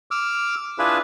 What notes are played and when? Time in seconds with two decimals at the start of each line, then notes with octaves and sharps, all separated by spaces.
0.11 D6 E6 F6
0.79 D4 E4 F4 G#4 B4